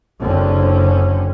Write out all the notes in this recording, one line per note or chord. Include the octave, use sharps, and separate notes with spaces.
F#1 D3 C4 C#4